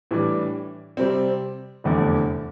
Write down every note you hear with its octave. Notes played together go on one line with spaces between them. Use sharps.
A2 E3 G3 D4
C3 G3 C4
F1 E2 D3 A3